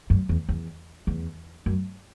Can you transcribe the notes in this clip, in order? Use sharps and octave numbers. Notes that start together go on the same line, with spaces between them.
F#2
E2
E2
E2
F#2